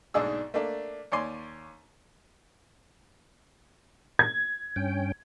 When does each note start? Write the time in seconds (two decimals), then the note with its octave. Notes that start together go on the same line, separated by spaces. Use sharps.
0.14 B1 G#2 D4 G#4 E6
0.54 A3 A#3 D4
1.12 D#2 C#5 D5 G#5 C6
4.19 G#6
4.76 G2 C#4 G5